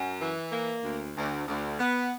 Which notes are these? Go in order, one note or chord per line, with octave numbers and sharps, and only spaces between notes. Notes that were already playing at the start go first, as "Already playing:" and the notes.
Already playing: F#2
E3
A#3
D2
D2
D2
B3